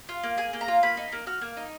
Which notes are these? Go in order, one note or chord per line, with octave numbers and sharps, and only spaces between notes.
F4
A#3
G#4 G#5
A#3
A#5
F4
A#3 B5
D#4
A#3
F#4 F6
A#3
D#4